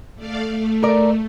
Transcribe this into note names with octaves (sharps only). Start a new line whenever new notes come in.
A3 D5 F5
A3
A#4 D5